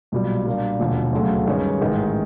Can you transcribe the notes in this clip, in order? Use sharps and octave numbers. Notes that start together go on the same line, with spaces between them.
B1 A#2 G3
A#2 G3 A#3 D4
E1 D#2 D3 F3
D2 C#3 F#3 A3
G2 D#3 G#3 C#4
A1 G#2 D#3 G#3